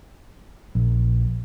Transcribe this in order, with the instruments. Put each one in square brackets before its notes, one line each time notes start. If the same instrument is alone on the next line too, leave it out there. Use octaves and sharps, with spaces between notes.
[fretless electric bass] A#1